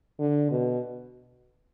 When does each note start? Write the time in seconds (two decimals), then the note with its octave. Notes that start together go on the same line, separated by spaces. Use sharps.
0.19 D3
0.51 B2